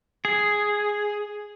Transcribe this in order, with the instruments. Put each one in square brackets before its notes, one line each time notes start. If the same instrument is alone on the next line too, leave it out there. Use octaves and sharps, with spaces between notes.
[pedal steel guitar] G#4